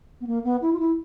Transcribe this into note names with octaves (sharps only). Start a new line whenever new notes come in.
B3
A#3
B3
E4
F4
E4